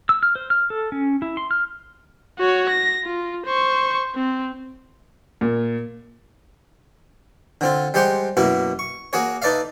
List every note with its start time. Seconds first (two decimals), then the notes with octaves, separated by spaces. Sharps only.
0.09 E6
0.23 F6
0.36 C5
0.50 F6
0.70 A4
0.92 C#4
1.22 E4
1.37 C6
1.51 F6
2.39 F#4 C#5
2.69 A#6
3.04 F4
3.46 C5 C#6
4.15 C4
5.41 A#2
7.61 D3 C4 F4
7.94 G3 G#3 G4 C5 F#5 G5
8.37 F#2 B2 A#3 E4
8.79 C#6
9.13 A#3 F#4 G#4 C#5
9.42 D#4 A4 B4 D5 E5 F5